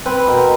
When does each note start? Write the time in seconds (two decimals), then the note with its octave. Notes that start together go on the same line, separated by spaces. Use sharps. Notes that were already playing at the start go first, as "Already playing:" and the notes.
0.06 C4 B4 B5
0.28 B2 A#4 A#5